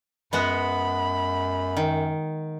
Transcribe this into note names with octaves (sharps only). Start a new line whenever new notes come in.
F#2 G#3 B3 F#4 B5
D#3